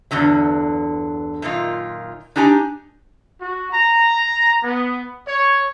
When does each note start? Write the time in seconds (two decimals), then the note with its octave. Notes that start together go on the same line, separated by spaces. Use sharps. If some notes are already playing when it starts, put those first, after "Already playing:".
0.11 E2 G2 D3 F#3
1.42 F#2 A#2 D#3 F4
2.36 D4 D#4 G4 G#5 A#5
3.40 F#4
3.72 A#5
4.64 B3
5.27 C#5